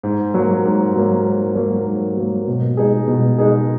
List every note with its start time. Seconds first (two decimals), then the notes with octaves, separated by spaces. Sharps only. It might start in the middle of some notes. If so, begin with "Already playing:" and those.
0.03 G#2
0.34 F#3 A#3
0.65 G#2
0.95 F#3 A#3
1.25 G#2
1.55 F#3 A#3
1.87 G#2
2.17 F#3 A#3
2.47 B2
2.77 G#3 D#4 G#4
3.08 B2
3.38 G#3 D#4 G#4